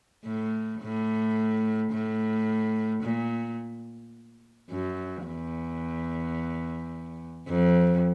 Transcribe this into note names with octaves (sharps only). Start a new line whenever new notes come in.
A2
A2
A2
A#2
F#2
E2
F2